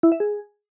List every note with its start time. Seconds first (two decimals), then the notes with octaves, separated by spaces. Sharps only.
0.03 E4
0.12 E5
0.20 G#4